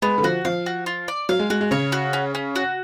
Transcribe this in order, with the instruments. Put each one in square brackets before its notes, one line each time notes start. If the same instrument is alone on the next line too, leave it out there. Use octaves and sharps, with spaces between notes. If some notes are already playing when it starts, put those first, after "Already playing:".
[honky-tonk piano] G#3 [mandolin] B3
[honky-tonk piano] D3
[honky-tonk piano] F3 [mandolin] F#4
[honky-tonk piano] F3 [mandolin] F5
[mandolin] F#4
F4
D5
[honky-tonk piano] F#3 [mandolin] F5
[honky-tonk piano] G#3
[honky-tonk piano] G#3 [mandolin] F#4
[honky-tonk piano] G#3
[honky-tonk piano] C#3 [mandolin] C#5
[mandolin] F#4
C#4
C#4
F#4